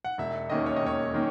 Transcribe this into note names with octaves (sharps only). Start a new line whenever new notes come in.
F#5
E1 E5
D#2 D#3 A#3 C#4 D#5
C#5
D#5
E1 C#5
D#3 A#3 C#4